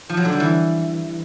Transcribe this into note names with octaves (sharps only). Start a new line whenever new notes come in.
F3
F#3
D3
G3
E3